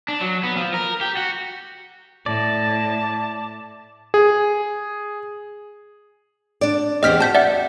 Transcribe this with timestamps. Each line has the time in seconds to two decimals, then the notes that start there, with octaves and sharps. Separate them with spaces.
0.08 D4
0.21 F#3
0.43 B3
0.57 F3
0.74 A#4
1.01 G4
1.17 F#4
2.26 A2 D5 A5
4.14 G#4
6.61 D4 D5
7.03 E2 C4 G4 D#5 F6 B6
7.20 F#4 A5 G6 B6
7.35 D5 E5 F#5